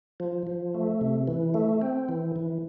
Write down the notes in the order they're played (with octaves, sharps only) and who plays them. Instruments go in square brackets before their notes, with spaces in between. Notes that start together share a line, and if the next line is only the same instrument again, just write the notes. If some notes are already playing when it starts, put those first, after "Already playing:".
[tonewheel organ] F3
F3
A3
C3
E3
A3
C4
E3
E3